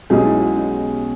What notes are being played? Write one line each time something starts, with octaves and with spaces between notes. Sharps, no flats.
B1 B2 G#3 C#4 D#4 G#4
E4
F#4
C#4